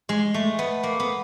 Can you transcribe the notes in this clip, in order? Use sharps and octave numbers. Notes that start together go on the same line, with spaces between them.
G#3
A3
B3
A#3
B3